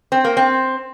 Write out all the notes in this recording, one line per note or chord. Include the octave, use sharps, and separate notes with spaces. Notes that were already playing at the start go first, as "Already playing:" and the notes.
C4
A#3
C4